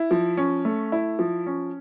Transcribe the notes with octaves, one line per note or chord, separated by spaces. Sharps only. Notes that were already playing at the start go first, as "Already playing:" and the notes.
Already playing: E4
F3
C#4
A3
E4
F3
C#4